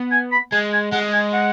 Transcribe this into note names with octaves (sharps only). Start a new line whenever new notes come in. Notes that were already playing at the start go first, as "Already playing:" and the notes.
Already playing: B3
G#5
B5
G#3 G#5
G#5
G#3 F#5
G#5
F#5